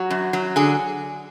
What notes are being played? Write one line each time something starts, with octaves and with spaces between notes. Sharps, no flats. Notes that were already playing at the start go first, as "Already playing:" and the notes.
Already playing: F#3 F#4
F#2
F#3
D3 G#4